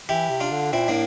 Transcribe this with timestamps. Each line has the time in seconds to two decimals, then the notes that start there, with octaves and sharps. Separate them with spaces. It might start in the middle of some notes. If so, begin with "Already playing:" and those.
0.08 E3 E4 G4
0.30 C3
0.40 D4 F4
0.51 D3
0.73 A#2 C4 E4
0.88 A2 A#3 D4